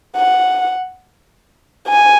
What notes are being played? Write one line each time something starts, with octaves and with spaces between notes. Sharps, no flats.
F#5
G#5